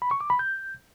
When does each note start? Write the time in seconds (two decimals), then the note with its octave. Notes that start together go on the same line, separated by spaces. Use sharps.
0.02 B5
0.11 C#6
0.21 D6
0.30 B5
0.39 G6